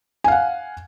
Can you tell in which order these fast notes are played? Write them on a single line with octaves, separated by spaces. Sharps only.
G#5 F5 F#5